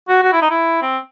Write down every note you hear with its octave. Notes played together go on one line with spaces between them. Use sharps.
F#4
F#4
E4
D#4
E4
C4